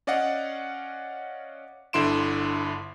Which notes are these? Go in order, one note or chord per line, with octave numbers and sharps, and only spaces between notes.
C#4 D5 D#5 F5 F#5
G1 D3 E4 C6 D7 E7